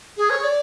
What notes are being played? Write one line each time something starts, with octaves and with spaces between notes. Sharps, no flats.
G#4
C#5
D5